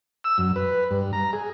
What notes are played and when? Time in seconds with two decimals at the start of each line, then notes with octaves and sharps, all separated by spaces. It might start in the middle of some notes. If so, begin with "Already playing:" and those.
0.24 E6
0.38 F#2
0.56 B4
0.91 G2
1.13 A#5
1.33 G#4